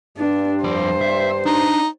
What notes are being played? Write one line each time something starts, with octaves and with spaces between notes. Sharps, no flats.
G2 D4
F2 C5 D5
E5
D4 D#4